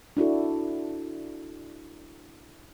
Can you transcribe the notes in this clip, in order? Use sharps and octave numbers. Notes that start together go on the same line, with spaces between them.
D4 E4 F#4 A4